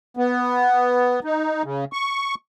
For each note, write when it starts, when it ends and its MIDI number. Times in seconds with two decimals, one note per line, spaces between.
0.17 1.20 59
1.24 1.63 63
1.64 1.85 49
1.93 2.35 85